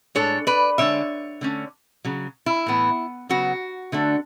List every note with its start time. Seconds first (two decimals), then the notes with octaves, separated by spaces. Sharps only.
0.15 A2 G#3 D4 A4 C#5
0.47 B4 D5
0.78 D3 G#3 D4 C#5 E5
1.41 D3 A3 C#4
2.04 C#3 F#3
2.46 E4
2.66 A2 E3 B3
3.29 C#3 F#3 B3 F#4
3.92 D3 A3 D4